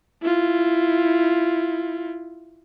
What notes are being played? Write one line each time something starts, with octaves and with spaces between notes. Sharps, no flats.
E4 F4